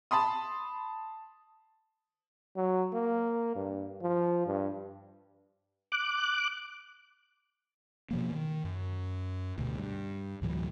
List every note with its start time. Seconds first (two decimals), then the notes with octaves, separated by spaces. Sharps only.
0.11 A5 B5 C6 D#6
2.56 F#3
2.93 A#3
3.56 G2
4.02 F3
4.47 G2
5.92 D6 F#6
8.11 B2 F3 A#3
8.32 D#3
8.64 F#2
9.58 D2 B2
9.78 G2
10.42 D2 A2 E3 F#3